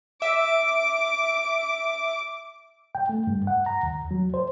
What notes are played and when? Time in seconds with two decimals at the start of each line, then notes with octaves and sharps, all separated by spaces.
0.22 E5 D6
2.95 G5
3.09 A3
3.27 G2
3.47 F#5
3.66 A#5
3.83 D#2
4.11 F#3
4.34 C5